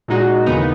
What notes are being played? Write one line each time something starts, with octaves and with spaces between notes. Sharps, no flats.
A#2 G#3 D#4 F#4
D#2 C#3 E3 B3 D#4